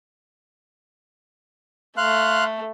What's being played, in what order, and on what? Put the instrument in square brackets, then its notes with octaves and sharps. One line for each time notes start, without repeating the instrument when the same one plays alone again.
[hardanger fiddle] A3 [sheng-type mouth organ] F5 C6 F#6